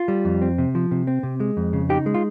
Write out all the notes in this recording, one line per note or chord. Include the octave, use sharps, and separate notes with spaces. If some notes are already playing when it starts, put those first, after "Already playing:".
Already playing: F4
G3
F2
C4
C3
F3
C3
C4
C3
G#3
F2
C#3
D#4 G4
G#3
F4